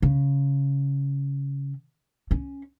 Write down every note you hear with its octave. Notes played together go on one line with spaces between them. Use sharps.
C#3
C#4